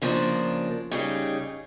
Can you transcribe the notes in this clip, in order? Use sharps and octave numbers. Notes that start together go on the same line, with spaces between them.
C#3 F3 A#3 D4 A#4
C#3 G3 D#4 G#4